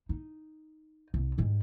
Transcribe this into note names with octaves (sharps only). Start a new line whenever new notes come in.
D#4
C2
G#2 G3